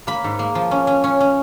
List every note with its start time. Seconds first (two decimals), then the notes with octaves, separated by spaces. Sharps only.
0.07 A#3 B5
0.24 G#2
0.39 A#3
0.55 F3
0.71 C#4
0.87 C#4
1.04 C#4
1.20 C#4